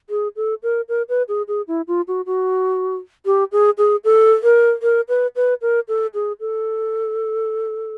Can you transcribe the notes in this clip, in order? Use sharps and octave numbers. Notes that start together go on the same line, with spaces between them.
G#4
A4
A#4
A#4
B4
G#4
G#4
E4
F4
F#4
F#4
G4
G#4
G#4
A4
A#4
A#4
B4
B4
A#4
A4
G#4
A4